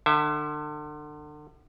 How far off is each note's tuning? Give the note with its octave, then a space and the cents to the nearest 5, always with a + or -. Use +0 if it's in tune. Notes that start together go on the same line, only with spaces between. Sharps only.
D3 +35 E5 +0